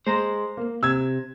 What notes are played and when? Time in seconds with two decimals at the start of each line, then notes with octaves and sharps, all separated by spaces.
0.07 G#3 C5 A#5
0.57 A#3
0.83 C3 E6 G#6